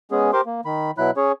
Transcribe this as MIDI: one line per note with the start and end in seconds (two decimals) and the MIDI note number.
0.11 0.31 56
0.11 0.31 59
0.11 0.31 61
0.11 0.31 68
0.33 0.41 67
0.33 0.41 70
0.33 0.41 72
0.33 0.41 84
0.33 0.41 86
0.46 0.61 58
0.65 0.91 51
0.65 0.91 83
0.98 1.11 47
0.98 1.11 54
0.98 1.11 64
0.98 1.11 83
0.98 1.11 90
1.17 1.32 61
1.17 1.32 68
1.17 1.32 73